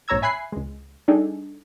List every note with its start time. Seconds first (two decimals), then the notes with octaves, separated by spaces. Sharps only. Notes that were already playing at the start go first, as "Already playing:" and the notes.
0.08 A#1 G#2 C#5 A#5 E6 G#6
0.22 E5 G#5 B5 F#6 C7
0.52 C#2 G#3
1.08 G3 D4 D#4 G#4 A4